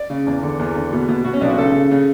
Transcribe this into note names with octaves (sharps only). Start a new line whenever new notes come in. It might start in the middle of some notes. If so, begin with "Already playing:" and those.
Already playing: D5
C#3
E2
D3
E2
D3
B2
B2
B2 F#4
C#4
B1 D4
F#4
C#3 A4
C#3
C#3